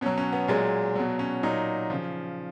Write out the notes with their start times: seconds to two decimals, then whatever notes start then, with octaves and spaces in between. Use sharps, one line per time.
0.01 B2 C#4
0.06 F#3
0.18 C#4
0.33 B3
0.48 A#2 F#3 G#3
0.95 B2 F#3
1.19 C#4
1.43 A#2 F#3 D#4
1.90 C#3 F3